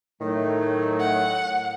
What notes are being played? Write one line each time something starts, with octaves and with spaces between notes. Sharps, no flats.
A2 D#3 F#3 A3
F#5